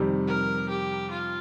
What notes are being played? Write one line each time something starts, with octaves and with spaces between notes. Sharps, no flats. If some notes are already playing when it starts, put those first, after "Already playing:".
Already playing: F2 C3 D#3 G3
A#4
G4
F4